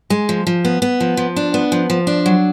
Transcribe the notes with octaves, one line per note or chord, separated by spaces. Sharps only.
G#3
F3
F3
B3
B3
F3
F3
D4
B3
F3
F3
D4
F#3